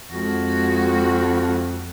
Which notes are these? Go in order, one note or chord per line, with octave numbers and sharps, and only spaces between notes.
F2 G#3 F#4